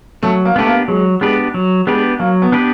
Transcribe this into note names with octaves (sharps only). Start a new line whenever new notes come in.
F#3 A3
A#3
A3 B3 D4 G4 B4
A#3
F#3 G#3
G#3 B3 D4 G4 B4
F#3
G#3 B3 D4 G4 B4
F#3 A#3
B3
B3 D4 G4 B4